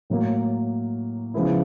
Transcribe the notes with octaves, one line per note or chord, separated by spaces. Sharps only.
A2 F#3 A#3
C#3 F3 G#3 B3 E4